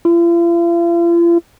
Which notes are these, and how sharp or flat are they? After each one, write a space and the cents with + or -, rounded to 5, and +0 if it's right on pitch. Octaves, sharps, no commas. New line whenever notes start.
F4 -45